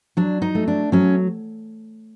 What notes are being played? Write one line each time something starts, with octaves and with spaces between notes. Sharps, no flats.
F#3 D4
D#4
A3
D4
F#3 C#4